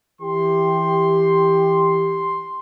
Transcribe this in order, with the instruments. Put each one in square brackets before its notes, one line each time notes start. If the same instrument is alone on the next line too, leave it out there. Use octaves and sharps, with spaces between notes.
[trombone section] E3 G4 [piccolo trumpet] C6